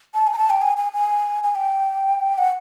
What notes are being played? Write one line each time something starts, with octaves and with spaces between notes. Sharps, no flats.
A5
G#5
A#5
A5
G5
G#5
G#5
G#5
G#5
G5
F#5